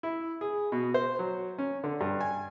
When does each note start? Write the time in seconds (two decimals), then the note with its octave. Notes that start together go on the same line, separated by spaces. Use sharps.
0.03 E4
0.41 G#4
0.72 B2
0.94 C5
1.19 F#3
1.58 C#4
1.84 D3
2.01 G2
2.21 G#5